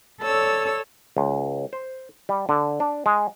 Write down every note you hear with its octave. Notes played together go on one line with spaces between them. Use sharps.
A4 C#5 D5 E6
C#2
C5
G3
D3
D4
G#3